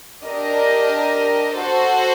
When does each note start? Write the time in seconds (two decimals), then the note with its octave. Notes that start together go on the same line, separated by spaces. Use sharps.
0.25 D4 G4 A#4 D#5
1.57 F#4 A4 C5